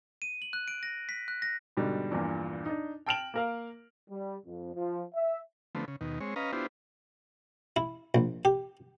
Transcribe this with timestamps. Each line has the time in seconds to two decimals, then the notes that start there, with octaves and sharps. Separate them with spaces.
0.22 D#7
0.42 F#7
0.53 F#6
0.68 D7
0.83 A#6
1.09 B6
1.28 F#6
1.42 A#6
1.77 G#2 B2 D3 G3
2.11 A#1 E2 G2 A#2
2.66 D4 D#4
3.06 G5 A5 F6 D7 E7 F#7
3.34 A#3 A#4 F5
4.10 G3
4.46 F2
4.75 F3
5.15 E5
5.75 D3 F3 A3 B3 C4
5.88 C#3
6.01 D#2 B2 D#3
6.21 G#3 C4 C#5
6.36 C#4 B4 D#5 F5 A#5
6.53 B3 D4 E4 F4 G4 C5
7.76 E4
8.15 A#1
8.45 G4